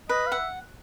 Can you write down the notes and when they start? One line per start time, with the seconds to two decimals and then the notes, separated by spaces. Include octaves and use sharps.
0.09 B4 D#5
0.26 F5
0.32 E5 F#5